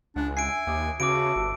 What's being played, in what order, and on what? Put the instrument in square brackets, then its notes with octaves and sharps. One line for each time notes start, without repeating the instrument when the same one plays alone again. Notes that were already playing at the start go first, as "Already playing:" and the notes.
[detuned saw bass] C#2 [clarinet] D4 [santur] F#5 G#5
[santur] E5 [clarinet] G#5 [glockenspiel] C7 D7
[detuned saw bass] D#2 [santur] G4 D#6
[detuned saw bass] C#3 [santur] B3 E5 A5 [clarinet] F#4 [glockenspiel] D6 D7
[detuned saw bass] G1 [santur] A4